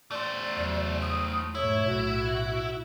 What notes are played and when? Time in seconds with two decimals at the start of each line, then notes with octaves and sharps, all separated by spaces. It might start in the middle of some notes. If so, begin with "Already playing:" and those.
0.11 A3 C5 D5
0.56 E2 F#3
1.02 D#6
1.55 G#2 B2 A3 E4 C#5
1.87 B1 A2 F#4